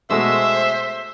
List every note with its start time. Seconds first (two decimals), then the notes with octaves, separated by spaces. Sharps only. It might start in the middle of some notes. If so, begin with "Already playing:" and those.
0.10 B2 G#3 A3 C5 E5 E6